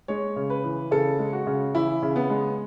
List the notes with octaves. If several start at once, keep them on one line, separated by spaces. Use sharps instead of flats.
G#3 C#5
C#3
B4
E3
C#3 A4
G#3
F#4
C#3
E3 E4
C#3
B3
G#3